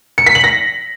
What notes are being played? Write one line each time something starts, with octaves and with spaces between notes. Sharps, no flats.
C#7
B6
F#7
A#6